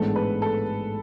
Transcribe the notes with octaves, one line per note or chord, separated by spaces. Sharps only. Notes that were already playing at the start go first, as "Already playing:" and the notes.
Already playing: A1 G#2 G#3 B3 D4 A4
B4
A4